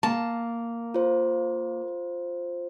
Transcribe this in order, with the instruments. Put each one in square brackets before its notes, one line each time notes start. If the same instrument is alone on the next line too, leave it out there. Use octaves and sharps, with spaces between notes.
[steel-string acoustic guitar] A#3 [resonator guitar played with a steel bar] A5
[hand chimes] F4 C5